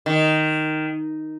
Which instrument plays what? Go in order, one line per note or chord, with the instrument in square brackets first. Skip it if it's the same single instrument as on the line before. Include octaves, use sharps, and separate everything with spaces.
[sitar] D#3